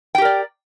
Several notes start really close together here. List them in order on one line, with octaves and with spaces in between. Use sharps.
G5 G4 A#4 D5